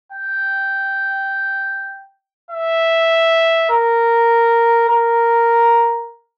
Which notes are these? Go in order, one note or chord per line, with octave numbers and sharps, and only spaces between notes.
G5
E5
A#4
A#4